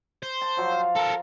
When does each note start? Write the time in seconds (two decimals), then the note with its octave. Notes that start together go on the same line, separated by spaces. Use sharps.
0.23 C5
0.42 A5
0.57 F3 F#3
0.72 F5
0.95 A4 A#4 A#5